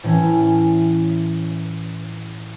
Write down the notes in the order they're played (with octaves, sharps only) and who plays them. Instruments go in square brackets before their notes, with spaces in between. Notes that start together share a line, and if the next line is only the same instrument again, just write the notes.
[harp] A2 E3 C#4